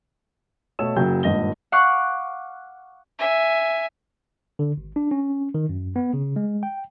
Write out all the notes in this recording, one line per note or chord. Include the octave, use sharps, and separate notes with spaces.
B2 A3 C#5 A5 E6 E7
F#1 C#3 F#3 G5 G6
D#1 G#1 G2 D#5 A#6 G7
F5 F#5 C#6 D6 F6 F#6
E5 G#5
D3
G#1
D4
C#4
D#3
F#2
B3
C#3
G#3
G5